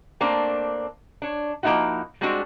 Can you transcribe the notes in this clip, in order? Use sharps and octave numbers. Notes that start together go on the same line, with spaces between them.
A3 A#3 C4 D4
D4 C#5
F3 A#3 C4 D#4 E4 F#4
G3 G#3 C4 D4 F#4